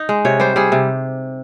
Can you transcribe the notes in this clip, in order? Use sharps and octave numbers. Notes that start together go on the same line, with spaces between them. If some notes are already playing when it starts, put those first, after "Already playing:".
Already playing: D#4
G#3
C3 C#5
G3 C5
G3 G#4
C3